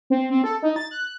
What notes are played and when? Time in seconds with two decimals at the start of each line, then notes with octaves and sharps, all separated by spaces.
0.10 C4
0.31 C4
0.44 A4
0.62 D#4
0.76 A6
0.91 F#6